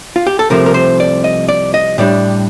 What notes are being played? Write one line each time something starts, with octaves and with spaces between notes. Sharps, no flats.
F4
G4
A4
C2 C3 F3 A3 A#4
A#4
C5
D5
D#5
D5
D#5
A2 G3 D4 D5